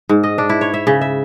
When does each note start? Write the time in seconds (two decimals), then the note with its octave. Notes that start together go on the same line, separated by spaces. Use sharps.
0.09 G#2
0.23 D#5
0.38 D4
0.49 E4
0.61 C#5
0.74 E5
0.87 C#3
1.01 E5